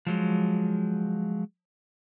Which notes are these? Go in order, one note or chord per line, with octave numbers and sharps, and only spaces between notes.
F3 F#3 G#3